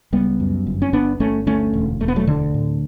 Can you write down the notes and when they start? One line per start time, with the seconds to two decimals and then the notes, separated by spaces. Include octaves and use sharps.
0.13 C#2 G3 B3
0.40 F#2
0.67 G1
0.82 C#4
0.93 G1 B3 D4
1.20 G1 A3 C#4
1.46 D2 A3 C#4
1.73 E1
2.00 E1 A3
2.08 B3
2.16 F#3 A3
2.27 D2 D3
2.54 A2